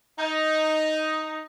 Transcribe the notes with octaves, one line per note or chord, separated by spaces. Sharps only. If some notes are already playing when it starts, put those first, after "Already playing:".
D#4